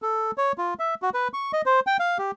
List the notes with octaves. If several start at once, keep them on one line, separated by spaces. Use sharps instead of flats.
A4
C#5
F4
E5
F#4
B4
C#6
D#5
C5
G5
F5
G4